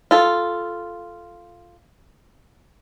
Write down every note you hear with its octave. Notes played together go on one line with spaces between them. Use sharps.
F4 A4